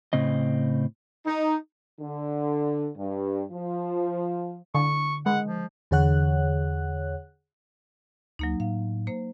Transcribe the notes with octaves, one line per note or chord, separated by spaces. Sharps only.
A2 C#3 C4 D#5
D#4
D3
G2
F3
D3 C#6
G#3 F#5
F3
E2 D3 G#4 C#5 F#5 F#6
D2 F#3 A#3 D#4
A2 F5
A#3 C5